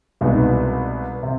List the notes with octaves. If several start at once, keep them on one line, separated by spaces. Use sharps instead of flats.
C2 B2 G#3 B3 D#4
C3